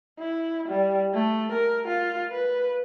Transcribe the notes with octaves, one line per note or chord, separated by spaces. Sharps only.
E4
G3
A3
A#4
F4
B4